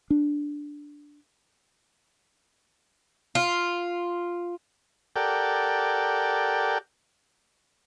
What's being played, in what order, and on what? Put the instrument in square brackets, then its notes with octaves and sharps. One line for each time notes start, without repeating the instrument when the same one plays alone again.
[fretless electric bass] D4
[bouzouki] F4
[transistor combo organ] G4 A4 A#4 D5 F#5 G5